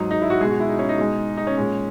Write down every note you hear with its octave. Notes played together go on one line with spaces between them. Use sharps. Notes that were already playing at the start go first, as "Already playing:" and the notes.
Already playing: G#2 F#3 D#4
D#4
E4
F#4
B2 G#3 G#4
F#4
E4
D#4
C#4
D#4
B2 G#3
D#4
C#4
A#2 G#3